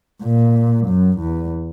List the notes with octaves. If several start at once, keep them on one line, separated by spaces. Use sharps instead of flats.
A#2
F#2
E2